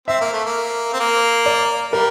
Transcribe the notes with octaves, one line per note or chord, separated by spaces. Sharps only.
C4 E5
A#3
A3
A#3
C4
A#3
D5
G3 A#4